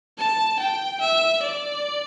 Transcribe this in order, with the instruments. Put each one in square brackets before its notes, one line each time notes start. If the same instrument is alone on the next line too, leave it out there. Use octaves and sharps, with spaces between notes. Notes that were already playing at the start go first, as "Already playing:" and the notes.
[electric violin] A5
G5
E5
D5